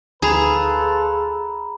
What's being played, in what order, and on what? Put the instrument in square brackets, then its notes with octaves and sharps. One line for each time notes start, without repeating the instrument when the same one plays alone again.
[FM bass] D2 [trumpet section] F4 A4 B4 [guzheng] G#4 [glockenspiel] A#5 B5